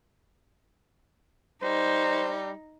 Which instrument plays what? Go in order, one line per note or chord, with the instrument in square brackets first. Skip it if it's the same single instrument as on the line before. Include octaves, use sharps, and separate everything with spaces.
[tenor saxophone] G3 [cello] D#4 [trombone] C5